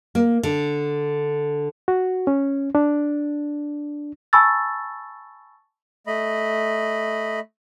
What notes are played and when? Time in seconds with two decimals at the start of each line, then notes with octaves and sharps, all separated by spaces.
0.15 A#3
0.43 D3
1.88 F#4
2.27 C#4
2.75 D4
4.33 G#5 A5 B5 C#6 E6 A6
6.07 A3 D#5 B5